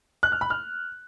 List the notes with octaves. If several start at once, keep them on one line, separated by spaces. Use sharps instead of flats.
F#6
F6
B5
F6